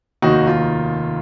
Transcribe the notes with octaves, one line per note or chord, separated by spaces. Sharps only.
F1 D#2 D#3 A#3 D#4 F#4
F4